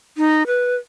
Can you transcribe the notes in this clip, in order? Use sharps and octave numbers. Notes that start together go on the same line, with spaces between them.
D#4
B4